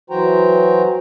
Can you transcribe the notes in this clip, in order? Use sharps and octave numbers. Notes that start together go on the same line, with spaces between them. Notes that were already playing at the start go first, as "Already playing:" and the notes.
E3 F#3 F#4 C5 G5 A#5